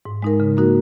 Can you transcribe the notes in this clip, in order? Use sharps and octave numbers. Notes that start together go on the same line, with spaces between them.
G#2
G#3 D#4 A#4
C#3
A#3 D#4 F#4 A#4